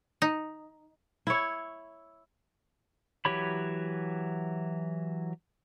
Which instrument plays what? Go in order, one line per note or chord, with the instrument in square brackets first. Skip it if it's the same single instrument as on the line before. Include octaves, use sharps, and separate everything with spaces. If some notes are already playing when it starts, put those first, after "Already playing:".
[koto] D#4
[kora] E4 C#5
[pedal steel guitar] E3 F#3 G4 C#5 B5